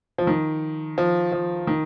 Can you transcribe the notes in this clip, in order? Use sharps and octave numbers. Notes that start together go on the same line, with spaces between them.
F3
D#3
F3
F3
D#3